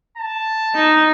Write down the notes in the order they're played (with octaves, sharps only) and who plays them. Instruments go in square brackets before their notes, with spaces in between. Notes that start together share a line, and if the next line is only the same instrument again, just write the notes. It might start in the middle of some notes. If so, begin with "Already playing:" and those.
[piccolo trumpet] A5
[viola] D#4